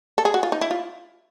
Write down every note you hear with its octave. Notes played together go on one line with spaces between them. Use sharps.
A4
G#4
F#4
F4
D#4
E4
F4